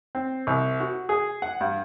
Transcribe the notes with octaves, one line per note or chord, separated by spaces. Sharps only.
C4
C2
F#4
G#4
F#5
G2